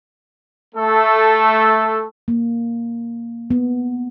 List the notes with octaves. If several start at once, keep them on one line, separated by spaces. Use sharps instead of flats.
A3 A4
A#3
B3